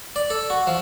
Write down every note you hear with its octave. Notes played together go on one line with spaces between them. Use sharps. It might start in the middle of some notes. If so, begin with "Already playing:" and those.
D5
A4
F#4
F3